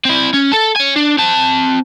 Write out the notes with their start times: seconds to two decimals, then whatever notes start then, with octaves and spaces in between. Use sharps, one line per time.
0.05 C4 E4
0.34 C#4
0.53 A4 A5
0.76 C#5 G#5
0.96 D4
1.18 C4 A5